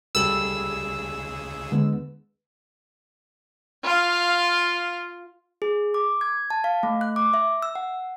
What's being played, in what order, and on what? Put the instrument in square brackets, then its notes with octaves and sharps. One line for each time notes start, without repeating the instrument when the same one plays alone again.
[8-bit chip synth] C#2 C#3 G#4 [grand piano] G3 A4 F#7 [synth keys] E6
[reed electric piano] D3 G#3 B3 [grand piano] B4
[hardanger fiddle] F4 F5
[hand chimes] G#4
D6
G#6
A5
F5
A3
F#6
D6
E5
E6
F#5